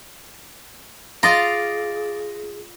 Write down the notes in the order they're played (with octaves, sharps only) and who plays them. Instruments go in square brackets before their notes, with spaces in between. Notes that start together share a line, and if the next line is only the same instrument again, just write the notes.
[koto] F4 D#5 F5 [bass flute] G#4 [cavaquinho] D5 [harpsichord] A#5